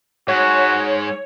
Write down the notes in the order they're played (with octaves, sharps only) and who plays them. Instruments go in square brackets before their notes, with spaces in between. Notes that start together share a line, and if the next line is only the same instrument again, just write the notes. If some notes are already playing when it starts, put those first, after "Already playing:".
[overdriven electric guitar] G#2 [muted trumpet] F#4 [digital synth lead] C#5